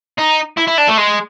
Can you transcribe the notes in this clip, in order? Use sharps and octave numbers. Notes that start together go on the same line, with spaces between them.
D#4
E4
E4
D4
A3
G#3